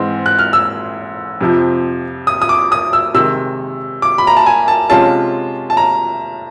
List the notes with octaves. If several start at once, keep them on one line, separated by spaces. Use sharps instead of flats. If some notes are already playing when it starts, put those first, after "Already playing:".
Already playing: G#2 E3 G#3 C4
F#6
F6
E6
F2 C3 F3
D#6
D#6
D6
D#6
E6
C3 D#3 G#3 E6
D6
B5
A#5
A5
G#5
A5
C3 F3 G#3 C#4 F4 A5
A5
A#5